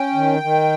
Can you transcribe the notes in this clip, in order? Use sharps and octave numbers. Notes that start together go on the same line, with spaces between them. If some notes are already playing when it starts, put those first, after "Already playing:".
Already playing: C#4 G5
D#3
D#3